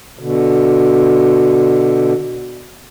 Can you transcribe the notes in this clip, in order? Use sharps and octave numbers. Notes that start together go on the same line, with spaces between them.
B2 D3